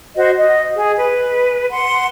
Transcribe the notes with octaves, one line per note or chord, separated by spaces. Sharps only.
F#4 C5 D#5
D#5
G#4
B4
F#5 C6